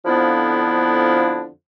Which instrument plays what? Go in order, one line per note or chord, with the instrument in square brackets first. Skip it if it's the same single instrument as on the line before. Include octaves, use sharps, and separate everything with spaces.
[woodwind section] F2 D3 F3 B3 D4 E4